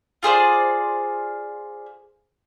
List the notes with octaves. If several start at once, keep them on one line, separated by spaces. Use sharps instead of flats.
F4 G#4 C5 D5